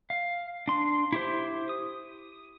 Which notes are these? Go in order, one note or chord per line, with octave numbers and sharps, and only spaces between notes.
F5
D4 C6
E4 G4 C5
D#6